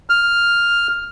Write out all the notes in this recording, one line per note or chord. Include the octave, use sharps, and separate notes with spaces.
F6